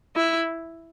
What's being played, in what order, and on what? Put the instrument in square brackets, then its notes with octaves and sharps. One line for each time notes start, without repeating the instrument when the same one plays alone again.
[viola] E4